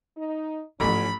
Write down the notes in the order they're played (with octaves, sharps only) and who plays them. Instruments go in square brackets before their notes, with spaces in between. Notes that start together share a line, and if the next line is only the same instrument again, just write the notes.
[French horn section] D#4
[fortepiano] A1 [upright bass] G#2 F3 [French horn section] B3 C#4 [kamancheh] B5